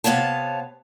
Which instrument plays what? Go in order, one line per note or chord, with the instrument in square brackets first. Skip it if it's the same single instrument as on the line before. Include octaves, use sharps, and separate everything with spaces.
[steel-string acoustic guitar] C3 B3 C#5 F5 A5